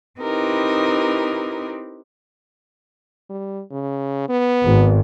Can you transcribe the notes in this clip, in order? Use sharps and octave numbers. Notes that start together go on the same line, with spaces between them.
C4 D#4 E4 G4 A#4 B4
G3
C#3
B3
G#1